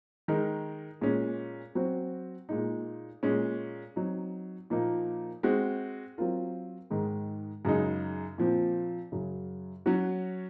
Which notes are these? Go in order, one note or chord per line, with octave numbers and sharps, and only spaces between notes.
D#3 G#3 D#4 A#4
A#2 G#3 C#4
F#3 C4 F#4 C5
A#2 G#3 D#4
A#2 G#3 C#4
F#3 C4 D#4
A#2 F3 A#3 D#4 A#4
G#3 C4 F#4
F#3 C4 F4 A#4
G#2 D#3 G#3
F#2 C#3 G#3 D#4
A#2 F3 C4
F#2 C#3 F#3
F#3 C#4 F#4